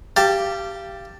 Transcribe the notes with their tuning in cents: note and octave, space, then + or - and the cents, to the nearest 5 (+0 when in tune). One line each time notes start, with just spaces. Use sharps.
G4 +0 F5 -30 A5 +10